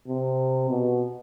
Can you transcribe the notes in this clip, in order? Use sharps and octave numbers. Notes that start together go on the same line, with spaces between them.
C3
B2